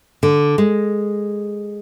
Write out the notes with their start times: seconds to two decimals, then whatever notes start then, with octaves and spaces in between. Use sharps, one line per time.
0.23 D3
0.58 G#3